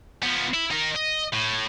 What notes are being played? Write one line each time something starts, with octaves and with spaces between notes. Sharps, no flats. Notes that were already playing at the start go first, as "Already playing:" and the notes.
F3 B3
E4
D#4 A#4
D#5
A2